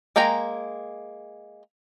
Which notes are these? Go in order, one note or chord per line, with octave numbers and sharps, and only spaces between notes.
G#3 A#3 G5 G#5 A#5